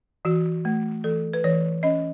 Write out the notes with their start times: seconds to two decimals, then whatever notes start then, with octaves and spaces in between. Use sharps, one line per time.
0.25 E3 F#4
0.65 A3
1.04 E3 A4
1.33 B4
1.44 E3 C#5
1.83 C#4 D#5